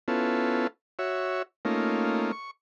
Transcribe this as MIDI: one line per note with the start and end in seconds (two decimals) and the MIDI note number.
0.08 0.67 59
0.08 0.67 61
0.08 0.67 64
0.08 0.67 65
0.08 0.67 69
0.99 1.42 66
0.99 1.42 73
0.99 1.42 76
1.65 2.32 57
1.65 2.32 58
1.65 2.32 61
1.65 2.32 63
1.65 2.32 65
2.32 2.51 85